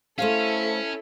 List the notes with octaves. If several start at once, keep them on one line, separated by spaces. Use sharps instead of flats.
A3 C#4 E4 A4 C5 F5